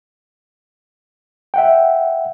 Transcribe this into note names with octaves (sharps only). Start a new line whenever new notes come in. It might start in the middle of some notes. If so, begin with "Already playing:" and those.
E5 F#5 G5